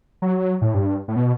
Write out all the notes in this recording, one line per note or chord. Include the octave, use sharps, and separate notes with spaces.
F#3
A2
G2
A2
B2